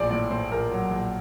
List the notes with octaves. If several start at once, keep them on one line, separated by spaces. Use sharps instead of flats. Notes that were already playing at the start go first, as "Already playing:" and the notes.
Already playing: A#1 A2 C5 D5
A2 D5
A2 C5
A#1 A#4
F#3
A#1